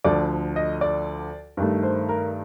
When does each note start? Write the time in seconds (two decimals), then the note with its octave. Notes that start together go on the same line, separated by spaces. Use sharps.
0.04 D2 D3 F3 D5
0.56 D#5
0.81 D5
1.57 G2 D#3 A3
1.83 C5
2.09 A#4